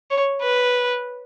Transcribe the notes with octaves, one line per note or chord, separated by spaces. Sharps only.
C#5
B4